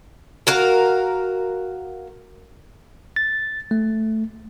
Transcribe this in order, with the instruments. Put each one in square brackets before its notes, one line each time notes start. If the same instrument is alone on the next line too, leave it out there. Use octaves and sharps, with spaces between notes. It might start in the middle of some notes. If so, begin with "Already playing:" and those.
[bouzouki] F#4 A#4 F5
[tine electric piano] A6
A3